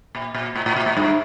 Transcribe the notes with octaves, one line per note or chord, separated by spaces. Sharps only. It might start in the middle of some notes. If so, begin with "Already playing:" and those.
A#2
A#2
A2
A2
A#2
A2
G2